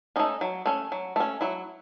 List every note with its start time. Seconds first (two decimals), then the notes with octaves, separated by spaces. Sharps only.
0.16 A3 C#4 D#4
0.41 F#3
0.66 A3 C#4
0.92 F#3
1.16 A3 C#4
1.41 F#3 E4